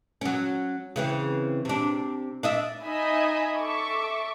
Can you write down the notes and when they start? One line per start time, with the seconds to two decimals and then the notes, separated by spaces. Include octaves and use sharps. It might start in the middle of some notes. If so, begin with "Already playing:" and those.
0.21 F#3 C#4
0.96 C#3 E3 C4
1.65 C3 D4
2.43 D4 D#5 E5
2.83 D#4 D#5 E5 G#5 B5
3.58 A4 E5 C#6 D6